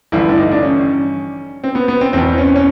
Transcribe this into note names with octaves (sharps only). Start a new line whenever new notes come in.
A1 G2 D3 F3 E4
D4
D#4
D4
C#4
C4
B3
B3
C4
E2 B2 C4
C#4
C#4